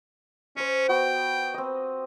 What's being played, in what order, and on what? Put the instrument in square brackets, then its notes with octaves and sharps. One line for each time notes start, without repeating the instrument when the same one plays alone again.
[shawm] C#4 [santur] C5 D#5
[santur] B3 F#4 D#5 [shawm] G5
[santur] C4 D#5